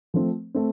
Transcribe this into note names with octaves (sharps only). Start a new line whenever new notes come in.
F3 A3 C4
A3 C4